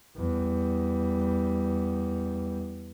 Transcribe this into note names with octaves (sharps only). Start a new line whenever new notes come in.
E2 G3